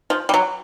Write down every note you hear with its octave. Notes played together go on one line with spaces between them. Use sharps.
F3
G3
F#3